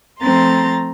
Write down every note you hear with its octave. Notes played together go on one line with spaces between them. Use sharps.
F3 A3 C4 A#5 C6 A6